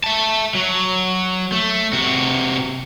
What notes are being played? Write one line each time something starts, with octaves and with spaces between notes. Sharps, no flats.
E5 A5
F#3
A3
C3 F#4